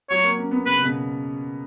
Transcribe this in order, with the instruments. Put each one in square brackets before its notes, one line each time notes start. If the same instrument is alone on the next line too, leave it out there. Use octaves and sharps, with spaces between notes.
[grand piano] F#3 [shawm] C#5
[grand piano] A#3
C#4
B3
[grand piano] C#3 [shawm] B4
[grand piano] C#3
B2